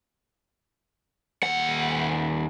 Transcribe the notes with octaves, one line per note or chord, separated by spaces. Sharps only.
D#2 F#5